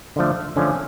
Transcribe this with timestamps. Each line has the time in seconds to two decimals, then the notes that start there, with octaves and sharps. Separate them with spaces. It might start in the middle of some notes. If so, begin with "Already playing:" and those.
0.16 D3 F3 A3
0.56 D3 F3 A3 C#4